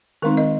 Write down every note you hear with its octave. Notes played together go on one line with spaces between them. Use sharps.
D#3 G#3 C4 D#4 A#4
D#5